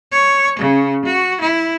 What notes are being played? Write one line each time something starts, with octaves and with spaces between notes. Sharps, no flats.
C#5
C#3
F#4
E4